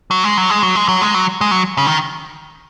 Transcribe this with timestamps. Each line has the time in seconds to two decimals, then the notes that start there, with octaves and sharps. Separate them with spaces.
0.11 F#3
0.24 G#3
0.37 F#3
0.50 G#3
0.63 F#3
0.76 G#3
0.88 F#3
1.02 G#3
1.14 F#3
1.41 G#3
1.51 F#3
1.78 C#3
1.86 D#3